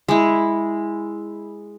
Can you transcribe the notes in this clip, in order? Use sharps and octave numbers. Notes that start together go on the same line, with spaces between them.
G#3 E4